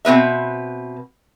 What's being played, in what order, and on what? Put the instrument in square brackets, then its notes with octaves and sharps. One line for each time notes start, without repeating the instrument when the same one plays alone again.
[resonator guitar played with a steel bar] B2 C4 B4 E5